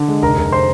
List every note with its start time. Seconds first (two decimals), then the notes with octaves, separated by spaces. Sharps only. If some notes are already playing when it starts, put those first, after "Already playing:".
Already playing: D3
0.08 G#3
0.22 F1 A#4 A#5
0.37 F1
0.52 C5 C6